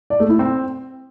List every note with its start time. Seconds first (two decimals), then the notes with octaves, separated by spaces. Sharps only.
0.10 D5
0.20 A3
0.30 E4
0.39 C4